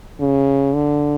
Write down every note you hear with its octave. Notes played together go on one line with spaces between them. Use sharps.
C#3
D3